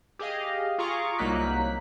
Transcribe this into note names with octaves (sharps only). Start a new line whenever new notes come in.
G4 G#4 D#5 F5
F4 G#4 A#5 C#6 D6
C2 F#3 A#3 D#4 F#6 B6